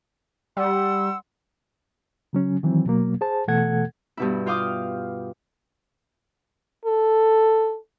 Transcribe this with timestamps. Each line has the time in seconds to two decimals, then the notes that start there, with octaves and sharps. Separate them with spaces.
0.57 G3 F#5 C6 E6
2.33 C#3 F#3 C#4
2.63 D#3 E3 F#3 C4
2.85 B2 F#3 A#3
3.21 G#4 C5 A5
3.48 B2 E3 A3 A4 F#5 G#6
4.17 G2 B2 E4
4.46 F4 F5 G5 D6 D#6 F6
6.85 A4